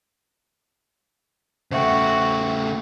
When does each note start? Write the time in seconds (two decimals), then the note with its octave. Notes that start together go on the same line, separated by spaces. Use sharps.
1.72 C#3 A3 F#4 C5 E5 G5